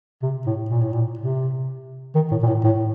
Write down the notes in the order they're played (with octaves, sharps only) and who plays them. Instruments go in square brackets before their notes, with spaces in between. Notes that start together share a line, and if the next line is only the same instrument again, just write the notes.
[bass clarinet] C3
A2
A#2
A2
A#2
C3
D#3
A2
A#2
A2
A2